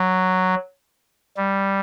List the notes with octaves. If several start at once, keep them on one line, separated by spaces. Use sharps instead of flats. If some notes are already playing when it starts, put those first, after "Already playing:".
Already playing: F#3
G3